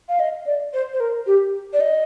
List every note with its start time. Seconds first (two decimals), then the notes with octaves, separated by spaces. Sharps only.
0.09 F5
0.19 D#5
0.46 D5
0.73 C5
0.93 C5
1.00 A#4
1.27 G4
1.73 D5
1.80 D#5